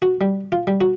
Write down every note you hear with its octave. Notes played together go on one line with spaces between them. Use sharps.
F#4
G3
F4
G3
F#4